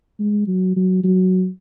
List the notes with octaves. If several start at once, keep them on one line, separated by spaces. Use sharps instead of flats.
G#3
F#3
F#3
F#3